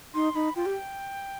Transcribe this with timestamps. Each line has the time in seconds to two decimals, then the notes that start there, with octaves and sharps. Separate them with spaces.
0.14 D#4 C6
0.34 D#4 B5
0.56 F4 G5
0.66 G4